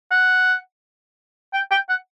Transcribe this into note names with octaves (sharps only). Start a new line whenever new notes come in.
F#5
G5
G5
F#5